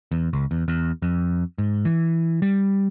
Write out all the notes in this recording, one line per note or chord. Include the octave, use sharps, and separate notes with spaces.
E2
C#2
E2
E2
F2
G#2
E3
G3